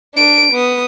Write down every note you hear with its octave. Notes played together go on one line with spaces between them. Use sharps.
D4 D7
B3 D#6